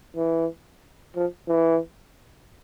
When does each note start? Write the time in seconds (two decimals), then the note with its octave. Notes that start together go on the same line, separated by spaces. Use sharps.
0.16 E3
1.15 F3
1.48 E3